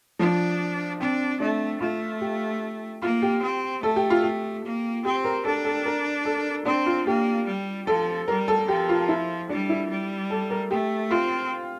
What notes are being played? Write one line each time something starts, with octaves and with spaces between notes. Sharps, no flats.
F3 D4
C4 D4
A3 D4
A3 F4
G4
A#3 F4
G4
C4
A3 A4
G4
F4
G4
A#3
C4 G4
A#4
D4 A4
A4
A#4
A4
C4 D4
F4
A#3 G4
G3
F3 A4
G3 A#4
A4
F3 G4
F4
E4
G3 D4
E4
G3
A4
A#4
A3 G4
C4 F4